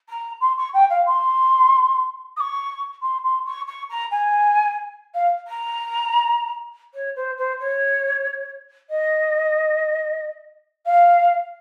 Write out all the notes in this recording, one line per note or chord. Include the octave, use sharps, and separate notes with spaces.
A#5
C6
C#6
G5
F5
C6
D#6
C#6
C6
C6
C#6
C#6
A#5
G#5
F5
A#5
C#5
C5
C5
C#5
D#5
F5